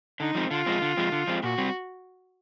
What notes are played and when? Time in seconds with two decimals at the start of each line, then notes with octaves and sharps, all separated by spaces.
0.20 D3 D#4
0.35 F3 G#3 C4
0.51 D3 F4
0.66 F3 G#3 C4
0.82 D3
0.97 F3 G#3 C4
1.12 D3
1.27 F3 G#3 C4
1.43 A#2 F#4
1.58 G3 C4